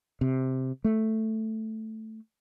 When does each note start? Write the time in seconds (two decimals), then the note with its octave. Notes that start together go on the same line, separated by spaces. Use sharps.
0.21 C3
0.84 A3